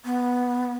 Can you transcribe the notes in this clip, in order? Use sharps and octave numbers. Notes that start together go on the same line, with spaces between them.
B3